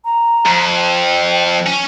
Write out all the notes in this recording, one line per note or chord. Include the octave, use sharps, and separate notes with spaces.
A#5
F2
G5
C#4